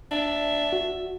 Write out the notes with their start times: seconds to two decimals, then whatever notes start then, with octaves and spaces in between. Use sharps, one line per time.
0.11 D4 E5
0.73 F#4